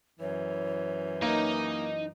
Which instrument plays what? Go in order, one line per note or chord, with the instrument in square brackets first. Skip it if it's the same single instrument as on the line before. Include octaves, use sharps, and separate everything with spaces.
[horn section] F#2 E3 [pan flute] C#5
[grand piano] A#3 [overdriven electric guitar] D#4